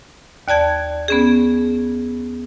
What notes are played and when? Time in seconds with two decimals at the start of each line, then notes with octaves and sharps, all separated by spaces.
0.48 D#2 D5 A5 G#6
1.08 B3 C#4 G#4